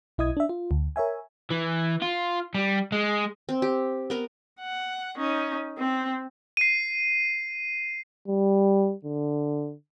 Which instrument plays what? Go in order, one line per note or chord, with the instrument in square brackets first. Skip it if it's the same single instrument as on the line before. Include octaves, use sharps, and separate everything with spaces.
[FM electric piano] B1 E4 D#5 D#6 G#6
D4 E5
F4
D2
A#4 C#5 E5 G#5
[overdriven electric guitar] E3
F4
G3
G#3
[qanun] C4
G4
B3 A#4 A#5
[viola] F#5
C#4 D#4
C4
[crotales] C7 D#7
[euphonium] G3
D3